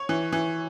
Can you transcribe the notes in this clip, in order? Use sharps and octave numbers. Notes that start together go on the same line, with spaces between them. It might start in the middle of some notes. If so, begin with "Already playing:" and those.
Already playing: C#5
E3
E3